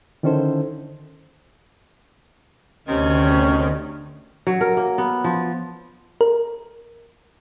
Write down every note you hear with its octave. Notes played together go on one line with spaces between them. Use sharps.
D3 D#3 C#4 E4 A4 C5
D2 C3 D#3 C#4
F#3
A#4
A#3
B3
F3
A#4